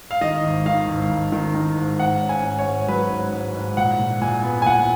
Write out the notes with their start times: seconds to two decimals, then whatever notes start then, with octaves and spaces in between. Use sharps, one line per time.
0.11 F5
0.21 D#3 D#5
0.44 G#1
0.66 D#3 F5
0.88 G#1
1.11 G#1
1.32 D#3
1.54 D#3
1.77 G#2
1.99 G#2 F#5
2.21 C#4
2.29 G#5
2.44 G#2
2.59 C#5
2.66 G#2
2.88 F#3 B4
3.10 G#2
3.33 G#2
3.54 G#2
3.77 A#2 F#5
3.99 A#2
4.21 A#2 G#5
4.43 B3
4.62 G#5
4.66 A#2 F#5